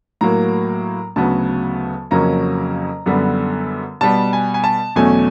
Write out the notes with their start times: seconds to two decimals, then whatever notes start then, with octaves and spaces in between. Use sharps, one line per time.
0.21 A2 F#3 A#3 A#5
1.16 D2 C#3 F#3 B3 A5
2.11 F2 C#3 F#3 A#3 C#4 A#5
3.06 F#2 D3 G3 B3
4.01 B2 G3 B3 A5
4.33 G#5
4.54 G#5
4.64 A5
4.96 E2 B2 F#3 A3 C#4 G#5